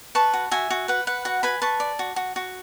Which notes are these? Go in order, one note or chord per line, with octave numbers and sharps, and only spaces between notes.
B4 A5 C#6
F#4
F#4 E5 G#5
F#4
B4 F#5
B4 F#5
F#4 F#5
B4 G#5 B5
B4 A5 C#6
D5
F#4
F#4
F#4